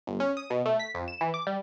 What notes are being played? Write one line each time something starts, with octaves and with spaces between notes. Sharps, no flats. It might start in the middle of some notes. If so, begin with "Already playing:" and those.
G1
C#4
D#6
B2
A3
B6
F2
E7
E3
D6
G3